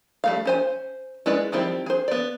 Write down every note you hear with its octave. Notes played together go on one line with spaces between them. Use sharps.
G3 A3 F5
C#4 C5 G#5
G#3 C#4 E4 B4 D5
D#3 F3 G3 C4 E4
G#4 C5
B3 D5